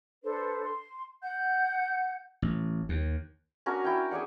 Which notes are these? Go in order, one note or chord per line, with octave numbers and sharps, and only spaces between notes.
D4 A4 B4 C5
C6
F#5 G6
A1
D#2
C#4 D4 F#4 A#4
E4 G5
G#4 C#5 D5 F#5